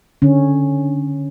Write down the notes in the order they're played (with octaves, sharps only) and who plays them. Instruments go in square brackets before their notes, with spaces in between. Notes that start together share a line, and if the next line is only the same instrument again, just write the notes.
[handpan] D3 C#4